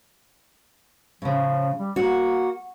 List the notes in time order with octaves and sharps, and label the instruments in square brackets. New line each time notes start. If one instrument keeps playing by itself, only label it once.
[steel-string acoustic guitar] A2 C#3 [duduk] F3
[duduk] G3
[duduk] A#3 [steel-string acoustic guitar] F#4